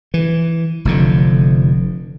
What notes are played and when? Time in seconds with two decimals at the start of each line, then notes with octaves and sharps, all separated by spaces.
0.14 E3
0.85 F1 F2 D3